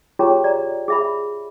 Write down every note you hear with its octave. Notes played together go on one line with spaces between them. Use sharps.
F4 G4 G#4 C#5 G5 A#5
D5 A#5
G#4 E5 B5